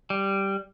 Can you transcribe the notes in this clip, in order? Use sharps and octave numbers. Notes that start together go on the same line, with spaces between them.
G3